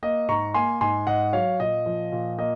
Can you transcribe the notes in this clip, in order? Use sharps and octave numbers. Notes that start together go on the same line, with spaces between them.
A#3 D#5
G#2 A#5 C#6
A#3 G#5 C6
G#2 G#5 C6
G#2 D#5 F#5
F#3 C#5 F5
A#2 D#5
F3
A#2
A#3 D#5